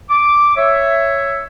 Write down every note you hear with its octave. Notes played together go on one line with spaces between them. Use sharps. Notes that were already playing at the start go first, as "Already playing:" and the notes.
D6
C#5 E5